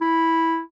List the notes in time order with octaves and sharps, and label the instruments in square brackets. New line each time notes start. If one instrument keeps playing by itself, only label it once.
[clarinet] E4